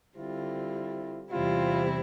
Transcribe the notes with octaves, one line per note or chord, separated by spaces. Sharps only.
D3 G3 C4 E4 F4
E2 C3 G3 C4 E4 F4